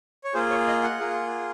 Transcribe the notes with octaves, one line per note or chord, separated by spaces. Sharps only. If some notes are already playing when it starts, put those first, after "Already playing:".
C#5
A#3 F4 G#4 C5
C#5
D#5
F#5
A#3 F4 G#4